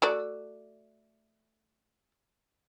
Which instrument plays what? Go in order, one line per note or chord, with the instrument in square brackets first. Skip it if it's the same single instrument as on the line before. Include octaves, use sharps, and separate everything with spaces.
[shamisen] A3 F#4 D5